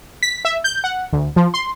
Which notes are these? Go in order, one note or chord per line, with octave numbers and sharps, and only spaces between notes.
B6
E5
G6
F#5
D2
F3
C6